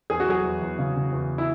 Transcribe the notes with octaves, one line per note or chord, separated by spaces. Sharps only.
E2 G#4
F#4
F#3 G#4
E2
E2
C#3
C#3
E2
E4